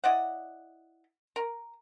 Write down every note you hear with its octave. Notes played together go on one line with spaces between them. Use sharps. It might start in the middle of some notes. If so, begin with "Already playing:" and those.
E4 D5 D#5 F#5
A#4